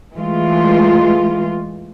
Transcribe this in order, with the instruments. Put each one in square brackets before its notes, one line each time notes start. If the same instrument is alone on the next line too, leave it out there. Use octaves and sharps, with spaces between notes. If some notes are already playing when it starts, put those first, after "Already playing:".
[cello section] E3 G#3 A3 F4